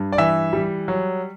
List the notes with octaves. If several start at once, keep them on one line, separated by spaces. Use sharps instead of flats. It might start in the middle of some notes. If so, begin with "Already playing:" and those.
Already playing: G2
D5
E3 E5
G3
F#3